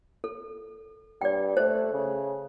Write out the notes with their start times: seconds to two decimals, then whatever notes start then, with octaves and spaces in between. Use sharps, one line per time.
0.24 A4
1.21 G2 D5 G5
1.57 A3 C5
1.92 C#3